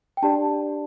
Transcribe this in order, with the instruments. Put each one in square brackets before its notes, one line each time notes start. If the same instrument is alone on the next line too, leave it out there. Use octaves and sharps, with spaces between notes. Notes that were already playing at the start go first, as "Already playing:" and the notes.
[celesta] G5
D4 G4 D5 A5